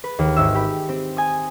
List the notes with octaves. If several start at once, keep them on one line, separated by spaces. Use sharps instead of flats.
B4
D#2
G#1 E5 E6
G4 B5
C4
G#5 D#6